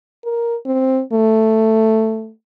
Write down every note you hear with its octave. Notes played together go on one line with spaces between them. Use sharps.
A#4
C4
A3